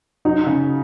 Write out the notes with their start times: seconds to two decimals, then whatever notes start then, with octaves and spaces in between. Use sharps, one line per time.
0.25 F#3 D#4
0.46 C#3